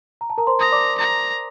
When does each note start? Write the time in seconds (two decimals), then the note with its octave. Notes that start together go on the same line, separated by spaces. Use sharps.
0.21 A#5
0.30 A5
0.38 A#4 A#5
0.47 C5 C6
0.59 A#5 D#6
0.72 D5 D6
0.98 A#5